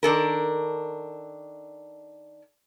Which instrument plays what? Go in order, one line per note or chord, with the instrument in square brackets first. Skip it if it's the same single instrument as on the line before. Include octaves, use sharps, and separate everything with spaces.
[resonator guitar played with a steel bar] D#3 D4 A4 A#4